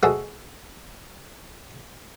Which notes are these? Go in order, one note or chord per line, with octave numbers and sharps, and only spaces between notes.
G#3 A3 F#4 G#4 A4 C5